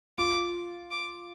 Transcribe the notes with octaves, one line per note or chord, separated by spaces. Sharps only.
F4 D6
D6